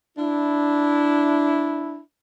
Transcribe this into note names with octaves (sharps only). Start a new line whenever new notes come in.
D4 E4